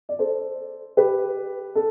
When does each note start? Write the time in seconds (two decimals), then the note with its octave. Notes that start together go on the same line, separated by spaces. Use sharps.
0.09 D5
0.19 A4 C5
0.97 G4 B4
1.75 A4